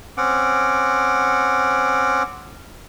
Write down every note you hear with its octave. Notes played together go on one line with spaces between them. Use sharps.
C4 C#4 F#5 D6